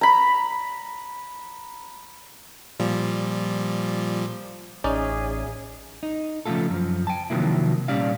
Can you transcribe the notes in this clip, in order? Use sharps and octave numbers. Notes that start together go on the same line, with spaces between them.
A#5 B5
A#2 F3 G3
A1 C#4 D#4 G#4 C#5 D5 E5
D#4
C#3 F3 F#3 A3 F4 A4
F#2 F3
G5 A5
C3 D#3 F3 F#3 A#3 E4
A#2 G3 C#4 D5 F5